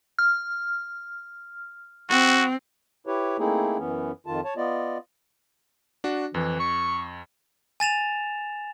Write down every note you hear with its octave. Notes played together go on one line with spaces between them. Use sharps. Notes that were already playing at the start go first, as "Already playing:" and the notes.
F6
C4 F#4
E4 G4 B4 C#5
A3 A#3 C4 D#4 E4 G#4
F#2 E3 B3 C#4
F2 D#3 F4 A5
C#5 A5
B3 F4 D5 D#5
D4 F#4
F2 E3
C#6
G#5 A6 E7 F7